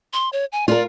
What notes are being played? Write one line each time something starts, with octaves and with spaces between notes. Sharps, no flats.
C6
C#5
G#5
F4 A#4 D5